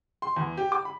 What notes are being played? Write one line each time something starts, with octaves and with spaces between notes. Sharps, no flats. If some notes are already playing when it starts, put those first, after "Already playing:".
C6
E2
G4
D6
B5